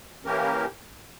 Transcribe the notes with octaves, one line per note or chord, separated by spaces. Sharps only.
E3 A#3 C#4 G4 A#4